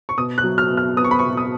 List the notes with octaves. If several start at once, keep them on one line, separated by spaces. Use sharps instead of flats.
C#6
B2 D#6
F#6
F#3
F6
B2
F6
B3 D#6
C#6
B5
C#6
B2
D#6